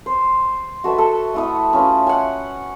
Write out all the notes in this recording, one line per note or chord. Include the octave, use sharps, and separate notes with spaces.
C5
F#4 A4 B4 E5
A4
A3 E4 D#6
C#4 F4 B4
F#5 G#5